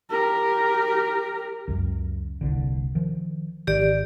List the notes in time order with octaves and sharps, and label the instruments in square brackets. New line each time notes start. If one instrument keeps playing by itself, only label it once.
[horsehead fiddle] G4 A#4
[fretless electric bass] C#2 F#2
D#1 C2 D3
D#3 F3
[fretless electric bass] G#1 D#3 [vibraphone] G4 D5